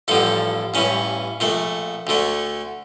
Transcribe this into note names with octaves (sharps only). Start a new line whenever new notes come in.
A1 G2 D3 F3 A4
A1 G2 E3 C#4
A#1 A#2 A3
D2 D3 A3